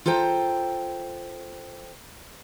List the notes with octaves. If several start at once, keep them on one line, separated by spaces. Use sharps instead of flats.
F4 A4 C5 G5 A#5